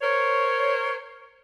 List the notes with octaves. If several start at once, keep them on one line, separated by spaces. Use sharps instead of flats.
A#4 C5 C#5